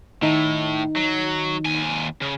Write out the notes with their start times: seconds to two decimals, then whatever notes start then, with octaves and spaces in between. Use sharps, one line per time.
0.22 A2 D#3 D#4
0.97 F#3
1.66 D#2 G#5
2.21 C#3